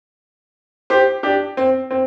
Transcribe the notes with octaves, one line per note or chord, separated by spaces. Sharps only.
G4 C5
D4 G4
C4
C4